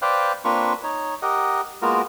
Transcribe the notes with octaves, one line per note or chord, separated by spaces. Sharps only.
B4 C5 D5 F5 G5 F#6
A#3 C4 D4 F4 B4 C#6
D#4 C#5
G4 A#4 D#5 F#5
G#3 A#3 B3 F4 F#4 A#4